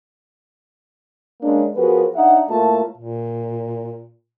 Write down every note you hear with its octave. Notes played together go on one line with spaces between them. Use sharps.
G#3 A#3 C#4 D4
F3 B3 F#4 G#4 A#4 B4
D4 D#4 E5 F#5
A2 A3 A#3 F4 A5
A#2